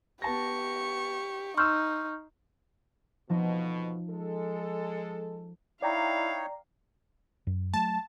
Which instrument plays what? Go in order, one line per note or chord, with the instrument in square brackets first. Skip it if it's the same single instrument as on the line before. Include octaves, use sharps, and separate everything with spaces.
[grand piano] B3 A5 A#6 [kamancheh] G4 C#6
[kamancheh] D#4 [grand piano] C6 E6 [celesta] C#6 F6 G6
[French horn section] F2 B2 [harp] F3 D#4
[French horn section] G#3 A4
[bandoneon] D#4 C#5 [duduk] E4 [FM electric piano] D5 G5 A#5 [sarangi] F5
[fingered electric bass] F#2
[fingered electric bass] F#3 A3 [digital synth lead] A5